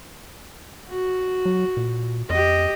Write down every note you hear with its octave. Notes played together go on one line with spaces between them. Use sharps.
F#4
F#3
A#2
F2 G4 D#5